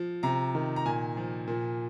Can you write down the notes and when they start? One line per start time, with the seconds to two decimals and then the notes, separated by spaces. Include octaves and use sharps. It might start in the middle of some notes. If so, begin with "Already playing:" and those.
Already playing: F3
0.23 C3 A#5
0.55 D#3
0.76 A#5
0.86 A#2 G#5
1.17 F3
1.48 A#2